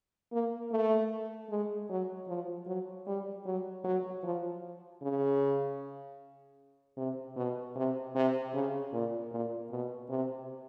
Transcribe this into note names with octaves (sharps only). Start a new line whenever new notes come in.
A#3
A3
G#3
F#3
F3
F#3
G3
F#3
F#3
F3
C#3
C3
B2
C3
C3
C#3
A#2
A#2
B2
C3